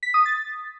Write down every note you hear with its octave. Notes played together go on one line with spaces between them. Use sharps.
B6
D#6
A6